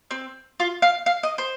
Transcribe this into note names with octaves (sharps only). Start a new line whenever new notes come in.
C4
F4
F5
F5
D#5
C5